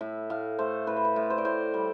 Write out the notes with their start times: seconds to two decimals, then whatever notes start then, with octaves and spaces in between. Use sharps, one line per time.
0.01 A2 E5
0.30 A2 F5
0.59 A3 C5
0.87 A2 B4
0.96 C5
1.05 B4
1.16 A2
1.30 C5
1.38 D5
1.45 A2 C5
1.74 G3